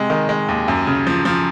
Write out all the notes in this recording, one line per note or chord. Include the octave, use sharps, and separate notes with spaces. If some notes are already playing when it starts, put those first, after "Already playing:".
Already playing: C3 G#3
D#3
G#3
D#2
F#2
C#3
F3
F3